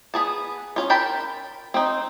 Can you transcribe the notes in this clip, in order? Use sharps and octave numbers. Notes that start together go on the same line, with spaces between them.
B3 G#4 A5
C#4 F4
A#4 G5 A5 B5
C4 D#4